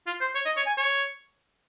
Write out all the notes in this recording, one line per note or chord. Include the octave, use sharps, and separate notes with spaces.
F4
C5
C#5
D#5
C#5
G#5
C#5